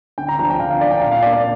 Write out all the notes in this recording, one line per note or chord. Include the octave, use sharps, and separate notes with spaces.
D3 G5
A#5
F3 D4 A#5
G5
D3 F5
F5
F3 D4 D5
G5
A#2 F5
F5
A#3 D4 D5
D5